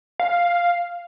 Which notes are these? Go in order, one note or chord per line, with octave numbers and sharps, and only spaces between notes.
F5